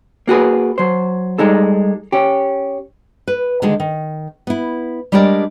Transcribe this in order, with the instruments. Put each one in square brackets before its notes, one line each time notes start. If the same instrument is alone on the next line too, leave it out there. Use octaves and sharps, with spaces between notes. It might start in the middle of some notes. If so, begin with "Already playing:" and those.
[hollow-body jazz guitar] A#3 F#4 G#4 B4
F#3 C5
G3 G#3 D#4 A4
C#4 G4
[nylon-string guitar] B4
D3 D#3 G#3 G#4
D#3
B3 E4
G3 G#3 D4 G4 A#4 D5